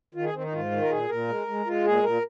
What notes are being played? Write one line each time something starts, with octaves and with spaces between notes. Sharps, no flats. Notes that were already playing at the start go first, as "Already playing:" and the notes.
D#3 F4
G#4
D#3 C4
D#4
G#2 F4
D#3
A#4
A#2 G#4
A#2 A#4
G#3
G#3
G#3 F4
A#2 G#4
A#2 A#4